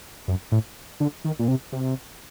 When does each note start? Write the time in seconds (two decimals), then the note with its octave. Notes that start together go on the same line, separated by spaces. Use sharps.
0.28 F#2
0.52 A2
1.00 D3
1.25 D#3
1.39 A#2
1.48 C3
1.72 C3